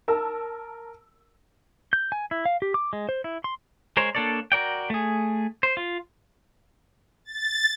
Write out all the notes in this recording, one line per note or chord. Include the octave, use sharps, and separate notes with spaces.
A#4 A5 E6
G6
G#5
E4
F5
G4
D6
G#3
C5
E4
C6
G#3 A#4 C5 C#5
A#3 D4 A4 C#5 D5
F#4 A#4 D5 G5
A3 G#4
C5
F4
A6